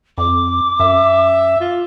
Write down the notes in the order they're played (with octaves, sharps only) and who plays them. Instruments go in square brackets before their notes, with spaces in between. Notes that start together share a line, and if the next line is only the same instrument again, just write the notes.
[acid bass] F2 [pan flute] D6
[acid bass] F#2 [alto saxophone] E5
[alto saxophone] F4